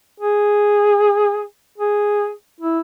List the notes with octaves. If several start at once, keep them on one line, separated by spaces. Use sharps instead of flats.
G#4
G#4
E4